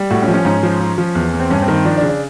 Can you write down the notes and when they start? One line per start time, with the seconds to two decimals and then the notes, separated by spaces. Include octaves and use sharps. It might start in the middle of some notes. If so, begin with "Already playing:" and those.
Already playing: G3
0.10 A2 F#4
0.23 C#4
0.28 F3
0.34 C#4
0.45 G#2 C#4
0.63 F3
0.80 F3
0.98 F3
1.15 E2
1.33 E2
1.40 C4
1.50 G2 C#4
1.62 C4
1.68 D#3
1.73 C4
1.85 F3 D4
1.97 D4
2.02 C#3
2.09 D4